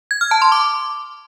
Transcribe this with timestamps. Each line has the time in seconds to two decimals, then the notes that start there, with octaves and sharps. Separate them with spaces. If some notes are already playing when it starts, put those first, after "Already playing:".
0.11 G#6
0.21 F6
0.31 A5
0.42 C6
0.52 D6